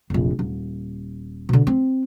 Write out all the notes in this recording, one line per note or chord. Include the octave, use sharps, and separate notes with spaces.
F1 A#1
D#1
B2 D3
C4